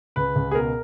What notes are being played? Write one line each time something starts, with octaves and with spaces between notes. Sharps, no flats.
C#2 B4
C#2
G#4
B2 A#4